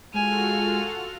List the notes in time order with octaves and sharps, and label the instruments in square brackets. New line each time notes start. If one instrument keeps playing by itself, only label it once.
[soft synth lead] G#3 [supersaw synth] F4 F#4 A4 [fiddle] G#5 [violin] F6